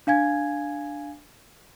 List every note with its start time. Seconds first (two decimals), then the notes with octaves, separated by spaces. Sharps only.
0.07 D4 F5 G#5 G#6